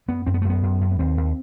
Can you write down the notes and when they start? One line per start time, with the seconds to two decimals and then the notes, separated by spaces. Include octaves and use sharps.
0.08 F#2 B3
0.26 F#2 C4
0.34 B3
0.42 A3
0.45 F#2 B3
0.63 F#2
0.81 F#2
0.91 B3
0.99 D#2 C4
1.17 D#2